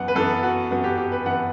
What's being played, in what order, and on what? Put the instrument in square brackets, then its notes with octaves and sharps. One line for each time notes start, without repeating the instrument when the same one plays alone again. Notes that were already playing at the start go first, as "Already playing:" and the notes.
Already playing: [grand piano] F#2 E3 B3 F#5
B4
F#2 E3 B3 A4
F#4
F#2 E3 B3 F#4
G4
G4
B4
F#2 E3 B3 F#5